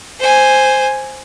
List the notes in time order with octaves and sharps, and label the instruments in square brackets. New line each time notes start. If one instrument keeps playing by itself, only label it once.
[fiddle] C5 G#5